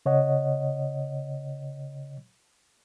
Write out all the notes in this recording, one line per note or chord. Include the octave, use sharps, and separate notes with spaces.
C#3 C#5 D#5 F#5